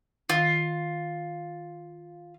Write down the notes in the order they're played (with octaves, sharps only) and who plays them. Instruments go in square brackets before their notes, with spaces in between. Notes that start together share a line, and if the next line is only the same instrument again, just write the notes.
[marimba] D#3 [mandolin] F4